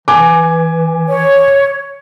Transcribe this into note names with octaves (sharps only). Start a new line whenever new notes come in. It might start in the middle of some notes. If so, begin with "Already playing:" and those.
E3 G#5 D6
C#5